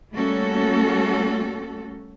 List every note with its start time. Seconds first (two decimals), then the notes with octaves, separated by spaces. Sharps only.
0.12 G3 A3 A#3 C#4 F#4 A4